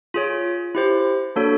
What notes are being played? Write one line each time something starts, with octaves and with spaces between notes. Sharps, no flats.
F4 G#4 C#5
E4 G4 C5
A#3 D4 F#4 A4 C#5